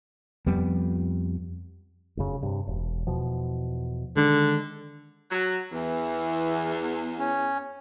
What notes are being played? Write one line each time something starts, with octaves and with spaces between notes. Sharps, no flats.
F2 G3 B3
F1 F#2 C#3
G2 C3
E1
E2 B2 F3
D3 D#3 G#3
F#3
E2 E3
C#4